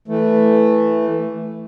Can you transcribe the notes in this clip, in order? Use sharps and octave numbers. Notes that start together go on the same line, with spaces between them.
E3 A3